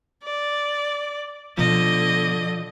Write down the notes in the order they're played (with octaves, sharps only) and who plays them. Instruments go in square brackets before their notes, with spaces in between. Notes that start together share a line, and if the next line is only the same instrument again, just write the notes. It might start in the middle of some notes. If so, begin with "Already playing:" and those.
[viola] D5
[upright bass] B2 [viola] D3 D#5 [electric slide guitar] F3